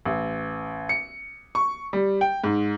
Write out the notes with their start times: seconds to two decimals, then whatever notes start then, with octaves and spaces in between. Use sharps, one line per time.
0.06 A1
0.89 C#7
1.55 C#6
1.93 G3
2.21 G5
2.44 G#2